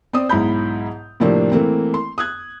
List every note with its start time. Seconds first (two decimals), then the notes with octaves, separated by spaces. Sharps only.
0.13 C4 C5 D5 D#6
0.29 B1 G#2 E4 A#5 B5 G6
1.20 A2 C3 F3 A#3 C4 D4
1.52 E3 A3 A#3 C4
1.94 C6
2.18 D#6 F#6 G#6